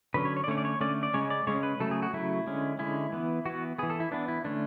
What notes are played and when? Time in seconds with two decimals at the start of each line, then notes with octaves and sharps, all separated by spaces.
0.14 D3 F#3 C#4 B4
0.25 C#5
0.37 C#5
0.44 D5
0.47 D3 A3 C#4 C#5
0.58 D5
0.65 C#5
0.81 D3 A3 C#4 D5
1.03 D5
1.14 C#3 G#3 C#4 C#5
1.30 D5
1.47 C#3 G#3 C#4 C#5
1.63 B4
1.80 C#3 F#3 A3 A4
1.91 G#4
2.02 F#4
2.13 C#3 F#3 A3 E4
2.46 D3 G#3 C#4
2.79 D3 G#3 C#4 E4
3.12 E3 B3
3.45 E3 B3 F#4
3.78 E3 B3 G#4
3.90 A4
4.00 E4
4.11 E3 B3 D4
4.28 E4
4.44 D3 A3 C#4 D4